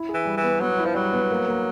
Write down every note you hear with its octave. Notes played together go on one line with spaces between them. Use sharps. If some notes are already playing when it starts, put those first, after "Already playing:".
Already playing: E4
E3 G#4
G3
E3
B3
F#3 B3
E4
F3
F#3 G3
B3
A#3
A#3